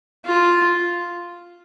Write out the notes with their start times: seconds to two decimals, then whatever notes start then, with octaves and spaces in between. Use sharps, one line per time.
0.25 F4